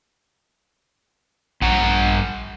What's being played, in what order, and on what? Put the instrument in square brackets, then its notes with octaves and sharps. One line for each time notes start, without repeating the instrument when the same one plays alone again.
[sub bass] A#1 [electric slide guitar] G2 F#5 A#5